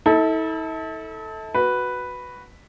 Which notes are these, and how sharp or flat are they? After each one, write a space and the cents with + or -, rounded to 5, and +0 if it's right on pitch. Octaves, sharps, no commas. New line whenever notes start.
E4 -45 A4 +0
F#4 +0 B4 +0